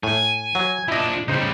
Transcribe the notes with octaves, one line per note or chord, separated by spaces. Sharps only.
A2 G#5
F#3
F3 D4 E4 D#5
C#3 G3 D#4 C5